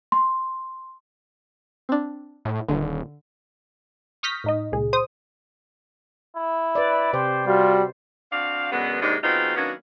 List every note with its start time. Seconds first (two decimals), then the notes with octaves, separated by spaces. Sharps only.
0.12 C6
1.89 C4 D4
2.45 A2
2.68 D#1 D3
4.23 C#6 D#6 F6 G6 A#6 B6
4.44 A2 D#4 D#5
4.72 C#2 A#2 G#4
4.93 C5 D#6
6.36 E4
6.75 B4 D5
7.13 C3 G4 C5
7.47 G3 F4 F#4
8.32 C4 D4 F#4 F5
8.72 F#2 B2 D3 G#3 B3
9.02 D#2 G#2 C3 G#3 D4 D#4
9.23 C#3 F#3 B3 C4 D#4 F4
9.56 D#3 F#3 A#3 B3 C#4 D4